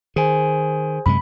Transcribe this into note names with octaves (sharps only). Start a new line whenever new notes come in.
D#3 G#4 C5 G#5
F#2 C3 G#3 B5